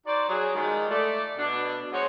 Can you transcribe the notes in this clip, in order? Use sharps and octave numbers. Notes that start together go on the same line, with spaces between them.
D#4 F#4 C5 D5
F#3 G#4
D#3 F3 G3 G#3
A3 D5
B2 D4
F#3 G#3 B3 F#4 C5 C#5